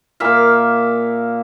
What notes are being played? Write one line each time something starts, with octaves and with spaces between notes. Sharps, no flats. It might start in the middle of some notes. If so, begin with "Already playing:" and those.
A#2 A#3 E5 F5